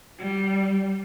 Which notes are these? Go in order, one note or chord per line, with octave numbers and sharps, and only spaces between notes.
G3